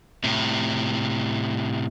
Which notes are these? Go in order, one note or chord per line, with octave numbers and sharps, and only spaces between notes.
A2 C3